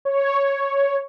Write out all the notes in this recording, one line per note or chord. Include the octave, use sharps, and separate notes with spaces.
C#5